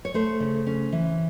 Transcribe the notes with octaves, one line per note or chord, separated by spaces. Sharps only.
C#5
A3 C5
C#3
C#4
E3